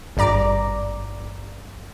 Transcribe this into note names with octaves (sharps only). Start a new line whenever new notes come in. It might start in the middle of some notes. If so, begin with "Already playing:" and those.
G#1 G2 D5 A#5 D6